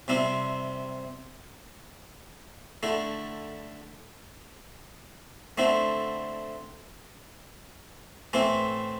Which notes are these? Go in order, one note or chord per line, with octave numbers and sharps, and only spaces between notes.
C3 G3 C4 E4
D3 A3 E4
D3 A3 C4 E4
A2 E3 A3 C4 E4